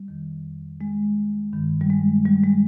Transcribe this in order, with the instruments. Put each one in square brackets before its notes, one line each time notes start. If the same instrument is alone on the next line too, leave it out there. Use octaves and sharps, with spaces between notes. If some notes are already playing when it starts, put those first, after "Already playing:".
Already playing: [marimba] G3
F2 D#3
G#3
G2 D#3
G3
G#3
G3
G#3